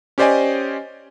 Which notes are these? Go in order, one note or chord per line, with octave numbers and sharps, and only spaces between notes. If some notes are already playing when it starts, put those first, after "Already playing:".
C#4 G4 C5 D5 D#5 G#5